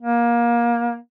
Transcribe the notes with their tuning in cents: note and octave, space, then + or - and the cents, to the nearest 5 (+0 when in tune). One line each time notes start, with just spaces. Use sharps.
A#3 +25